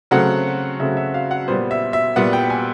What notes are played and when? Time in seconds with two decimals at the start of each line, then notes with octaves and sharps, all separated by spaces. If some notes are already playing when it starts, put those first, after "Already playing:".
0.11 C#3 F#3 A3 C4 F#5
0.79 C#3 F#3 A3 C4 E5
0.97 E5
1.14 F5
1.31 F#5
1.48 A#2 G3 B3 C5
1.71 E5
1.93 E5
2.16 A#2 G3 B3 F#5
2.33 G5
2.50 G#5